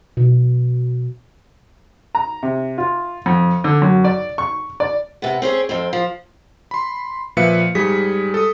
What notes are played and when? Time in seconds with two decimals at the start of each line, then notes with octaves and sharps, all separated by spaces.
0.17 B2
2.15 A#5
2.43 C3
2.78 F4
3.26 F2
3.64 D3
3.82 F#2
4.04 D5
4.38 C#6
4.80 D5
5.22 C3 B3
5.42 C4 C#4 G#4
5.69 F2 C4
5.93 F3
6.71 B5 C6
7.37 A#2 F3 B4 E5 F5 C#7
7.75 G#2 G3 G#4 B6
8.34 A4 D#6